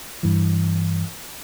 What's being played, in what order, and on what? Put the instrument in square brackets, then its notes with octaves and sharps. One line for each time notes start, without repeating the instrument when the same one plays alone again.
[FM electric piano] G2 E3